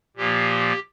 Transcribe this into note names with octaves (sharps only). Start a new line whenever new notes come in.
A#2 F3 A#3 G4